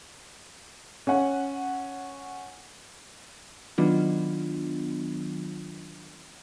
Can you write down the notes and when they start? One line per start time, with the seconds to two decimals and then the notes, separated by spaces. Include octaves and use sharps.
1.07 C#4 F#5
3.78 D#3 F#3 B3 D4 F4